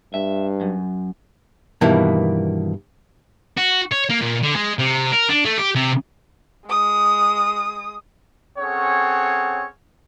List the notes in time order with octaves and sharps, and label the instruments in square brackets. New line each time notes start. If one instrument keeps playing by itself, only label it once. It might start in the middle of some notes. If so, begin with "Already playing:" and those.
[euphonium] G2 [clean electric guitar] E5
[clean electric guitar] F#2
[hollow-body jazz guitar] G2 B2 D#3 E3 A#3
[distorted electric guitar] F#4
C#5
A#3
A#2
D3
G#3
C3
A#4
D4
A3
G4
C3
[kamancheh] G#3 D#6
[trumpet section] C4 C#4 G#4 A4 C#5 F#5